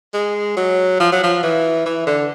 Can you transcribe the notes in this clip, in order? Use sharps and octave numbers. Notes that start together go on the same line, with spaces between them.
G#3
F#3
F3
F#3
F3
E3
E3
D3